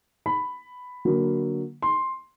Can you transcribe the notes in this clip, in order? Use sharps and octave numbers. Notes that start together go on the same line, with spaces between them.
B5
D3 F#3 A#3
C6